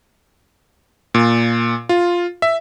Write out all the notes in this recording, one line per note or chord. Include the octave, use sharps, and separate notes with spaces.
A#2
F4
E5